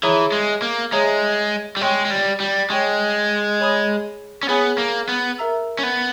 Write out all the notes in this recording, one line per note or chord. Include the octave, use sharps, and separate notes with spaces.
E3 G#4 C#5 E5 A#5 D#6
G#3
A#3
G#3 G#4 C#5 E5 A#5 D#6
G3
G#3 C#5 G5 C#6
G#3
G3
G3
G#3 C#5 G5 C#6
G#4 C#5 G#5 B5 D#6
C#4
B3 G#4 C#5 G#5 B5 D#6
A#3
B3
A#4 E5 A#5 E6
C#4
B3